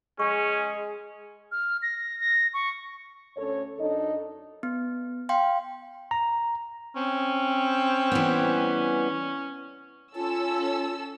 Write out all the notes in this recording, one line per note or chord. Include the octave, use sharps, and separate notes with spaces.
G#3 C#4 G#4 C#6
F6
A#6
A#6
C#6
D2 C#4 A4 C#5
F#2 D4 D#4 A4 D#5
B3
F5 G5 C6
A#5
C4 C#4
E3 G3 B3
C#4 F4 A4 E6